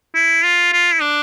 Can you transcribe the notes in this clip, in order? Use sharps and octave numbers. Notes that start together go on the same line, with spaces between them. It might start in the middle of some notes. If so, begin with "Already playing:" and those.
E4
F4
F4
E4
D4